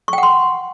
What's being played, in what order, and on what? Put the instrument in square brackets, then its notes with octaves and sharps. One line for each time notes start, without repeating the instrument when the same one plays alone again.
[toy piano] C#6
G5
F#5
C6